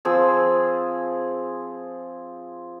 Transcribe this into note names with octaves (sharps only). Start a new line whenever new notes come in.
F3 C4 G#4 E6